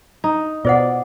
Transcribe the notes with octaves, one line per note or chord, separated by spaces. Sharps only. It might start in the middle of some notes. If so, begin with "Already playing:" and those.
D#4
B2 F4 C5 D5 F#5